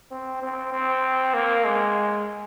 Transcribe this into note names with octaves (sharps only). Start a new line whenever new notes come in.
C4
C4
C4
A#3
G#3